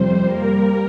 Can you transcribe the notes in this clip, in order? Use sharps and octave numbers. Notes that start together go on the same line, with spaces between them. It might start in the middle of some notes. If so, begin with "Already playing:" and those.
Already playing: F2 C3 G3 C5
G3 A#3 A#4